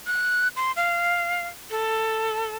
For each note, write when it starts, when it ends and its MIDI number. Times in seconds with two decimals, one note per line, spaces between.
0.07 0.48 90
0.56 0.72 84
0.76 1.48 77
1.70 2.56 69